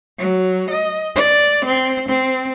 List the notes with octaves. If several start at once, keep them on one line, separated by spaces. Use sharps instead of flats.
F#3
D#5
D5
C4
C4